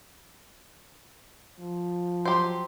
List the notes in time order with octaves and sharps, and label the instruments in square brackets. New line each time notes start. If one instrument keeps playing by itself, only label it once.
[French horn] F3
[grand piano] F#3 C6 [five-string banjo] G4 C5